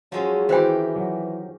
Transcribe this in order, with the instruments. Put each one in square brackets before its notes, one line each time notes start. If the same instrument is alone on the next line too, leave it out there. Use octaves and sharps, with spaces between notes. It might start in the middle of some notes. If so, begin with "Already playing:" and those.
[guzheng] F3 G#3 C#4 [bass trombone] F#3
[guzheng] D#3 G4 [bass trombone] E3 [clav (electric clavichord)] C4 E4 [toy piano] F#4 C5 G5
[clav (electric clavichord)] F#3